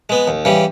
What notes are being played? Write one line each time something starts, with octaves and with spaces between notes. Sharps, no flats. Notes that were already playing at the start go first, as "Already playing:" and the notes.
G#3 B3
D#2
C#3 E3 G3